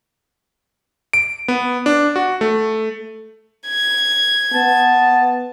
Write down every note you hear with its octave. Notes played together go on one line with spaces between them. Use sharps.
D7
B3
D4
F#4
A3
G#6
B3 A5